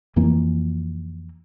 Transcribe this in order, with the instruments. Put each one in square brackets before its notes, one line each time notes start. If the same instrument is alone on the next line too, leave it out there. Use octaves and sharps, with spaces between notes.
[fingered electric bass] F2 E3 A#3